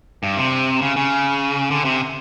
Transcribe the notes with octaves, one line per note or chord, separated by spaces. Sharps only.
G2
C3
C#3
C#3
D3
C3